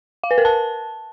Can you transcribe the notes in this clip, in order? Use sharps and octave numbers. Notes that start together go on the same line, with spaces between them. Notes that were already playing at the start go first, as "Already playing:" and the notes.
F5
B4
A#4
A5